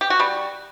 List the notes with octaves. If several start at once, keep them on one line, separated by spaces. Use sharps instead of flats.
G4
F#4
G3